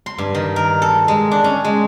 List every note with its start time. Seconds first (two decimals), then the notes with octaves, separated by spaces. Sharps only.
0.06 C6
0.18 G2
0.35 D#3
0.56 A#4
0.82 A4
1.08 G#3
1.31 D4
1.44 C#4
1.64 G#3